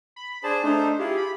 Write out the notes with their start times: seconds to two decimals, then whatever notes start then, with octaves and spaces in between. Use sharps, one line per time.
0.16 B5
0.44 D4 G#4 C5 A5
0.64 A3 D4 D#4 C5
0.99 E4 F4 G4 G#4
1.17 B5